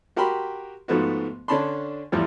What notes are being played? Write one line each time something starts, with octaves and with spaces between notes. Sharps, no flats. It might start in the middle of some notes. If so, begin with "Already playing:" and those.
F#4 G4 A#4 G5 B5 C6
G#2 F3 A3 B3 F#4
D3 C#4 D4 A5 B5 C6
E2 A2 F3 G3